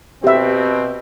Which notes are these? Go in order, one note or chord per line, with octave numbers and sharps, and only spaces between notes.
B2 C4 G4 E5